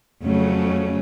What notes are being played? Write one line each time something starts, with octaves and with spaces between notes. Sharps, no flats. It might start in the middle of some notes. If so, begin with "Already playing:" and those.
F2 C#3 F#3 A3 C#4